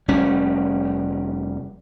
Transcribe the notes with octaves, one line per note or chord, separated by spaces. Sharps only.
F1 G3 C#4